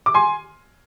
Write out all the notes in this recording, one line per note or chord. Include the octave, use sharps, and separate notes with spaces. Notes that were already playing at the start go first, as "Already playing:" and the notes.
D6
G#5 C6